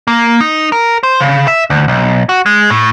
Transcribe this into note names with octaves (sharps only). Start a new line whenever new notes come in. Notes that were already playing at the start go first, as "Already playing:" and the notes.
A#3
D#4
A#4
C5
C#3
E5
D2
B1
F#4
G#3
A2